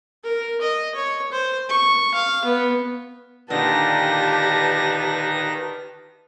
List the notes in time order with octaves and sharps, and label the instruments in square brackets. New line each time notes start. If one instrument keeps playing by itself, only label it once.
[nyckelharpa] A#4
D#5
C#5
C5
C#6
F5
B3
[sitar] A#2 D3 [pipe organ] D#3 A#6 [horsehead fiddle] G4 A5 [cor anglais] B4